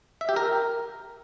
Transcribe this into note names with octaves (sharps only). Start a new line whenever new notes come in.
E5
G4
A#4